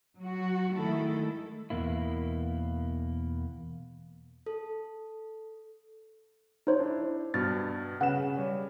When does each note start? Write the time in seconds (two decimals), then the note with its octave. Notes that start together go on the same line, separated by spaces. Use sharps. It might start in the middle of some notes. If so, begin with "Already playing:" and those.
0.18 F#3 F#4
0.75 D#3 G#3 A3 E4 A4
1.70 E2 B2 A#3 E4
4.46 A4
6.67 D#4 C5 C#5
6.79 D4 E4
7.34 G2 B2 F6 A6
8.01 C#3 B4 F#5 E7
8.37 G3 C#5